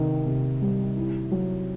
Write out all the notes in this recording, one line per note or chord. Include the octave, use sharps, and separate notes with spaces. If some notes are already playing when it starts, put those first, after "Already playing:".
Already playing: C3 D#3
C3
G3
E4
F#3